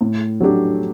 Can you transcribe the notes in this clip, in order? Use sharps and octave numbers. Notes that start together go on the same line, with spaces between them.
A2
F#3 A3 D4 G4